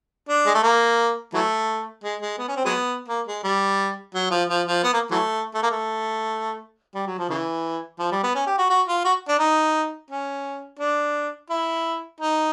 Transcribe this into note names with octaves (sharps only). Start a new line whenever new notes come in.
D4
G#3
A3
A#3
E3 F#3 A3
G#3
G#3
B3
C#4
C4
F#3 G#3 B3
A#3
G#3
G3
F#3
F3
F3
F3
B3
A#3
E3 F#3 A3
A3
A#3
A3
G3
F#3
F3
C#3 E3
F3
G3
B3
C#4
G4
F#4
F#4
F4
F#4
D4
D#4
C#4
D4
E4
D#4